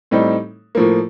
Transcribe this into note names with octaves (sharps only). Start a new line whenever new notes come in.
A2 G3 C4 D#4
A2 F3 A#3